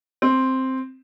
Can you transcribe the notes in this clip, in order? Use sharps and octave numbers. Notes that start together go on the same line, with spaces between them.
C4